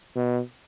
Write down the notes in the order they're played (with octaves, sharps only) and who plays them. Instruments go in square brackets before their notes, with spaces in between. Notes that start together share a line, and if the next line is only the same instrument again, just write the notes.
[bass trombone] B2